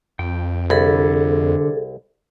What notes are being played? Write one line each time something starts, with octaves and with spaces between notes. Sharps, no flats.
F2 G5
C2 D3 G#4 A4 B5